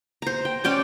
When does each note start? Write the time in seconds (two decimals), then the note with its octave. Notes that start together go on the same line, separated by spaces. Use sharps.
0.22 C5 A#5
0.45 G5
0.64 C#4 D5 G5 A5